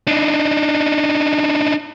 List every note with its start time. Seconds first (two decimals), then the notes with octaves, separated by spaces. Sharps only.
0.07 D4 D#4